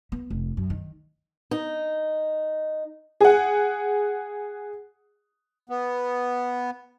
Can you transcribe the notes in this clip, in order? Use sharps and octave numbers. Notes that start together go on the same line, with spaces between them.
B3
F1
F#2
D#3
D#4
G#4 F#5
B3